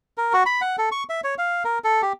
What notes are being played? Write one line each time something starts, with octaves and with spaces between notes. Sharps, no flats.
A#4
F#4
B5
F#5
A4
C#6
E5
C#5
F5
A#4
A4
G4